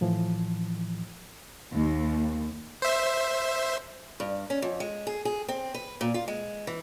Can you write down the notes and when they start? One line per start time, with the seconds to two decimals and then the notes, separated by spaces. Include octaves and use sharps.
0.01 A2 E3 F3
1.73 D#2
2.82 C5 E5
4.20 G2
4.50 C#4
4.62 F2
4.80 G#3
5.07 G#4
5.25 G#4
5.48 C4
5.74 B4
6.01 A#2
6.14 F4
6.28 G#3
6.67 E3